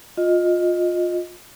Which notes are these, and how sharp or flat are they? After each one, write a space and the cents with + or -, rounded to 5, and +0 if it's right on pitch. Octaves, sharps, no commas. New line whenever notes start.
F4 +20 D#5 +0